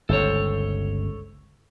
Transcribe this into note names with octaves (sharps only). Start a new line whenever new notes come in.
G1 C#2 A4 C5 C#5